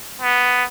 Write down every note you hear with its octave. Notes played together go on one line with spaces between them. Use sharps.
B3